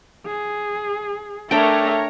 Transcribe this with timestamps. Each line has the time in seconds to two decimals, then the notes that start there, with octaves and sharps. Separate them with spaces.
0.26 G#4
1.51 A3 D4 A4 A#4 C#5 G5 A#5